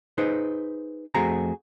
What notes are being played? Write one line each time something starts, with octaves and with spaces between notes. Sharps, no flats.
D#4 G#4 B4 C5
F2 A3 C4 F#4 G#4 A#5